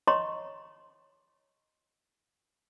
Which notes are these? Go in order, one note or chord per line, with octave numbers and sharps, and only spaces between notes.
C#5 D#5 A#5 C6 C#6